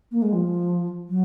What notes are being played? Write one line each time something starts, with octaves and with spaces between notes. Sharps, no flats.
A#3
G#3
F3
F#3